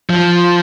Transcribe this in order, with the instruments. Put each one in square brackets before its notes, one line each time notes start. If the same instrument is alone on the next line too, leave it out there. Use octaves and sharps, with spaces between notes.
[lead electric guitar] F3